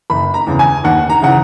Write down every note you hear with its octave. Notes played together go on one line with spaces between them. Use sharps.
F#1 B5
A#5
E2 C#3 E3
G#5
D#2 F#5
A#5
C#3 E3 F#5